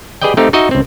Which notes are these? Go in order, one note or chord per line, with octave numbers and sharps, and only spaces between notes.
G4 G#4 B4 D5 D#5 G5
A3 C4 D#4 G4 F5
D#4 F#4 D#5 E5
C#2 C4